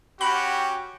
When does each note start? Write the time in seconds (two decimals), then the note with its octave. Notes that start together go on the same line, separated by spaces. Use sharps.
0.21 C#4 F#4 G4 G5 B5